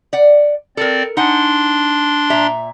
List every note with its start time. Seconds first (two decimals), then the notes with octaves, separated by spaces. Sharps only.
0.13 D5 F#5
0.77 C4 A4 A#4 D5
1.17 D4 D#4 F#5 G#5 C6
2.30 A#2 E5 A#5